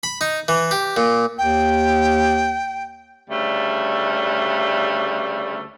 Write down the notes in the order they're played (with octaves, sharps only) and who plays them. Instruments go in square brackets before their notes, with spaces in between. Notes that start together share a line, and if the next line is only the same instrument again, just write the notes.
[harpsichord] B5
D#4
E3
G4
A#2
[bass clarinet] D#2 [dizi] G5
[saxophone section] D2 C#3 G3 A3